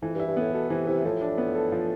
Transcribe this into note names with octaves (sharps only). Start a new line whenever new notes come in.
F2 E3
G2
E4
G2
A2 B3
B2 A4
C3 E3
C3 E4
A2 F3
D4
B3
A4
F3